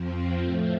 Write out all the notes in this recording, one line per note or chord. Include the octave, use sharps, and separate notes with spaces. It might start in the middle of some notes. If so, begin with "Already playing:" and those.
Already playing: F2 F3 C4
C5
A2 F3 A3 A4